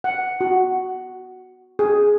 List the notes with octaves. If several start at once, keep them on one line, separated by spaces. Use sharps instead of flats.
F#5
F#4
G#4